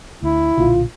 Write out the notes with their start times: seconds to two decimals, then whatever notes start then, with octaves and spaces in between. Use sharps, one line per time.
0.23 D2 E4
0.58 B1 A#2 D3 F4